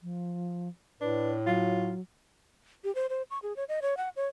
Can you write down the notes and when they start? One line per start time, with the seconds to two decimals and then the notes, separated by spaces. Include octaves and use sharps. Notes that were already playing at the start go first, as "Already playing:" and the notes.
0.02 F3
1.01 A2 D4 B4
1.46 F#3 F4
2.84 G4
2.95 C5
3.10 C5
3.31 C#6
3.43 G#4
3.56 C#5
3.69 D#5
3.82 C#5
3.97 F#5
4.16 C#5